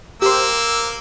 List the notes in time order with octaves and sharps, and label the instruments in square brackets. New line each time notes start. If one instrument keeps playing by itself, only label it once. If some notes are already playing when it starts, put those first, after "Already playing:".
[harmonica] A#3 E6 [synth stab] G4 C5